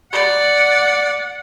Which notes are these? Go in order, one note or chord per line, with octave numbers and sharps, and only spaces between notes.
D5 F#5